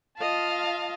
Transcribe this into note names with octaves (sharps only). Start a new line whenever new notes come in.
F4 D#5 F5 A5